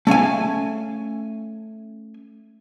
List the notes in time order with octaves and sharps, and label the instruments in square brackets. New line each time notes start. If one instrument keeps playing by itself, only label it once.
[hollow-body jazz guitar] A3 C#4 F5 G#5